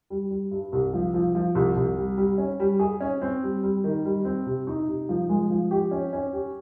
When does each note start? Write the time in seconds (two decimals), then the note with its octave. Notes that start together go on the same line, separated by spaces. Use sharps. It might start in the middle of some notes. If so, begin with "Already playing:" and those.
0.10 G3
0.30 G3
0.51 G2
0.72 C2
0.93 F3
1.14 F3
1.35 F3
1.55 C2
1.76 C2
1.97 G3
2.17 G3
2.38 C#4
2.60 G3
2.79 G#4
3.00 C#4
3.22 C4
3.43 G3
3.63 G3
3.84 D#3
4.05 G3
4.25 C4
4.46 C3
4.67 D#4
4.88 C3
5.09 F3
5.29 G#3
5.50 F3
5.71 G4
5.91 C#4
6.13 C#4
6.33 G4